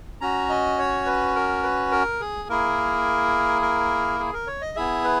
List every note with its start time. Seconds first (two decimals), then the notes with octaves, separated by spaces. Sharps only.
0.21 C#4 F#4 A#5
0.49 D#5
0.78 C#5
1.06 B4
1.36 A#4
1.63 B4
1.91 A#4
2.21 G#4
2.49 A#3 E4 G#4 A#4
3.62 A#4
4.20 G#4
4.33 A#4
4.47 C#5
4.61 D#5
4.76 B3 E4 G#4 E5
5.04 B4